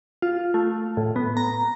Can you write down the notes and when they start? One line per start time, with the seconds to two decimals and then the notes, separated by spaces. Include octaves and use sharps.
0.22 F4
0.54 A3
0.97 A2
1.16 B3
1.37 A#5